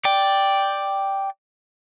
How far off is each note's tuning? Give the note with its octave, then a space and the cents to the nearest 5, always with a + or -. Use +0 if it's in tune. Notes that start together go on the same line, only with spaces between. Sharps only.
D5 +0 G5 +0